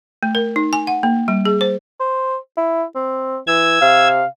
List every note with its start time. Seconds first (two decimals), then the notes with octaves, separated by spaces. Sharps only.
0.23 A3
0.35 A#4
0.56 D#4
0.73 G#5
0.87 F#5
1.03 A#3
1.28 G3
1.45 G#4
1.61 C5
2.00 C5
2.57 E4
2.95 C4
3.47 E3 E6 G#6
3.82 C3 F5